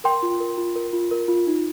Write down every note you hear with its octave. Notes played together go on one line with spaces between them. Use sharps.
A#4 G5 C6
F4
A#4
F4
A#4
F4
A#4
F4
D#4